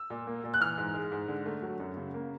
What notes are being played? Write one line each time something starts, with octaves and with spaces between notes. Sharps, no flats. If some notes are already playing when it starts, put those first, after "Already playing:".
Already playing: E6
A#2
A#3
A#2
F#6
E3 F6
G#2
G#3
G#2
D3
A3
F#3
F#2
C#3
A#3